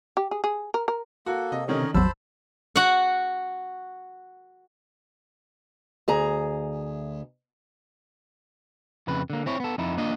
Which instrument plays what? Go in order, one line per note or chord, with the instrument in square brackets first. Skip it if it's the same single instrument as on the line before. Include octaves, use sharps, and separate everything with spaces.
[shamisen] G4
G#4
G#4
A#4
A#4
[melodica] A#3 A4 [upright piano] F#4
[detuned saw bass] C3 [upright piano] D#5
[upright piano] D3 D#3 C#4 [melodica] A#4 C#5 D#5
[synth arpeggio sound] A1 E2 [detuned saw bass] F#3 [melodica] C5 A5 B5 [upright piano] E6
[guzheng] F#4 F#5
[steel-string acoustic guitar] D2 G#4 A#5
[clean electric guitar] F2 C#3 B4
D3 A#3
C4 E4 C#5
B3 A4
F2 D#4 E4
A#3 D4 F4 D#5